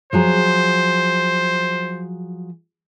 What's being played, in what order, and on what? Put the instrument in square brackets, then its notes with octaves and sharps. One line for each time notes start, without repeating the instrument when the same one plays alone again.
[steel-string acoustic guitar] F3 F#3 G#4 [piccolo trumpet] C5